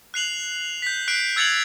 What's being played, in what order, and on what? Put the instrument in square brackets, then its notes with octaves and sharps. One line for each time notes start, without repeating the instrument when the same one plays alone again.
[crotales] F#6 C7 F7 F#7
G6 B6
F#6 C7 D7
E6 G#6 A6 C#7 F7 F#7